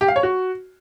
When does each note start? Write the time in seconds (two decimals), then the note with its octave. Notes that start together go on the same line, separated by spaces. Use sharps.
0.01 G4
0.08 F5
0.16 C#5
0.23 F#4